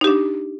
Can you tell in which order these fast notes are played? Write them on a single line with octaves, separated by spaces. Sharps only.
D#4 G4 D4